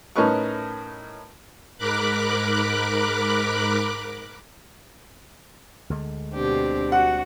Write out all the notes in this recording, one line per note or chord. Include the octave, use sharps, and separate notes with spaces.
A2 C#4 D#4 A#4 B4 C#6
G#2 A#4 B5 D6 F#6
D2 D3 G#3
B2 C4 D4 G4
F#4 F#5